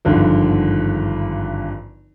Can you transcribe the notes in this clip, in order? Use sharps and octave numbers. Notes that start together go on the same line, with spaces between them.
G#1 G2 D3 F3